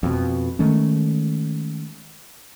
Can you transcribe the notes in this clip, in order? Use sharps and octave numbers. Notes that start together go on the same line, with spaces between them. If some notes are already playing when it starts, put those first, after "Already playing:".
F2 B2
D#3 G#3 A3 C#4